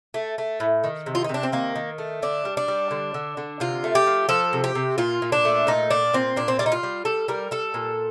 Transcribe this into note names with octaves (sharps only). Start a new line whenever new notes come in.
A3
A3
A2
D#3
C3
F4
D#4
C3
D4
C4
D#3 A#3
D#3
A3
D3 D4
G3
D4
G3
D3
D3
D3
C3 F4
A3
G4
F3
F3 A4
C3
G4
C3
A#2 F4
A#2
D4
A3
A#2 D#4
A#2 D4
A#2 C4
A#2 D4
C4
G3 D4
D#4
F4
G3
G3 A4
G3 A#4
G3 A4
A#2